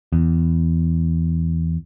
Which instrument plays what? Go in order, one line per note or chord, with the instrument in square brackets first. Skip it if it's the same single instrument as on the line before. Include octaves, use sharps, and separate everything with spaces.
[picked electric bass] E2